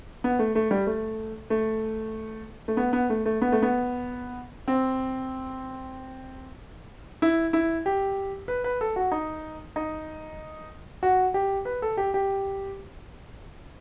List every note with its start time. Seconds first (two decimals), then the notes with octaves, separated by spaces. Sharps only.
0.24 B3
0.39 A3
0.55 A3
0.71 G3
0.87 A3
1.50 A3
2.68 A3
2.77 B3
2.93 B3
3.10 A3
3.26 A3
3.42 B3
3.52 A3
3.62 B3
4.68 C4
7.22 E4
7.53 E4
7.86 G4
8.48 B4
8.64 B4
8.81 A4
8.96 F#4
9.12 D#4
9.76 D#4
11.03 F#4
11.34 G4
11.65 B4
11.82 A4
11.97 G4
12.14 G4